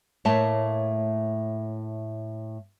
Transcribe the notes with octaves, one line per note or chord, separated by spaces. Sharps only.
A2 A3 A#3 C#5 A5